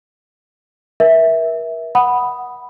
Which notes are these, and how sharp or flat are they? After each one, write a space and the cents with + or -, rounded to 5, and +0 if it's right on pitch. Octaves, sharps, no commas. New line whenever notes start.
A#4 +40 E5 -10
F#5 +0 B5 +0 D#6 +0